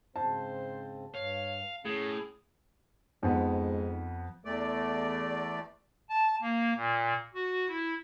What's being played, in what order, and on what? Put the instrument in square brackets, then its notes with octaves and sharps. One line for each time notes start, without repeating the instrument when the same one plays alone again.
[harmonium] G#2 C#3 C4 [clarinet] C5 [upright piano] A5
[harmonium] G2 [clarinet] C#5 [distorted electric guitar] F5
[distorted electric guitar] A2 [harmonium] C#4 [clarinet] G#4
[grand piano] F2 B3 [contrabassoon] G#2
[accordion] E2 A3 D5
[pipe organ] A5
A#3
A#2
F#4
E4